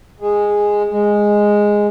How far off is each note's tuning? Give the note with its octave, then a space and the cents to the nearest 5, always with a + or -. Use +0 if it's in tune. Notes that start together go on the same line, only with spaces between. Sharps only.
G#3 -5
G#3 -5